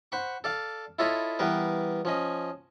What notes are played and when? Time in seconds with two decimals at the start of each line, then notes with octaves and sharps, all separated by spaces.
0.12 C5 F#5 B5 C#6
0.44 A4 D5 F5
0.99 E4 F4 A4 C#5 D#5 B5
1.39 E3 G3 B3 A#4 B4
2.05 F3 C#4 D#5